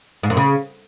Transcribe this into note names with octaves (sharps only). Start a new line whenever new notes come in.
G#2
F#2
C#3